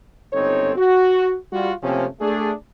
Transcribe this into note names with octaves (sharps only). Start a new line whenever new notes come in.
G1 C#2 C4 D#4 A4 C#5
F#4
G3 F4 F#4
C3 F3 A3 A#3 C4 C#4
A3 D4 G#4